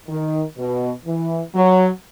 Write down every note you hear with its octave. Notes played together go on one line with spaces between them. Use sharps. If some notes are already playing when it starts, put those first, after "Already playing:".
D#3
B2
E3
F#3